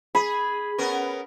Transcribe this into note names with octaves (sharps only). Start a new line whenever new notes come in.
G#4 B5
B3 C#4 A#4